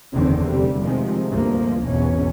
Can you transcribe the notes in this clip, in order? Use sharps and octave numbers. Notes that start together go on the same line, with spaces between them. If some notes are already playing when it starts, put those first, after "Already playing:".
F#1 E2 D3 D#3 C4
F1 G3
C3 D#3 F3 G#3
D2 G2 F3 A#3
G#1 E2 B2 C#4